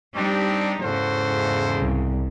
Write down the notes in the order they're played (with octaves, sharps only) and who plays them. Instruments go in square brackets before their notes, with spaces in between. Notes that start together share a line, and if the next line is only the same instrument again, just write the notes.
[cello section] G3 D#4 G4 [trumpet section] C4 D4
[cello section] E2 G#2 C#3 [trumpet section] F#4 A4 C5
[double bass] C2